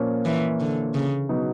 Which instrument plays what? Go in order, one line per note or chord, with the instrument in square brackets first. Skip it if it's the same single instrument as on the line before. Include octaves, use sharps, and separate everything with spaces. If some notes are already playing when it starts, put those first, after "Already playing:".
Already playing: [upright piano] A#2 F3 A#3 C#4
[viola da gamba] E3
D3
C#3
[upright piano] B2 F#3 B3 D#4